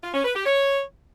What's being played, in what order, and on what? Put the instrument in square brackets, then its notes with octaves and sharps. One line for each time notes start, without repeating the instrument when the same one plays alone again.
[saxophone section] F4
C#4
B4
G4
C#5